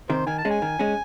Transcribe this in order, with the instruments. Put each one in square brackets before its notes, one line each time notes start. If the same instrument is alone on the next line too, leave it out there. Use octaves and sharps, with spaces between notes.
[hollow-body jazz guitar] C3 D#3 [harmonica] C5
[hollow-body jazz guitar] D#3 [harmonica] G#5
[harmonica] A5
[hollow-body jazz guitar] G#3 C#4
[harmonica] G#5
[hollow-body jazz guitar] D#3
G#3 C#4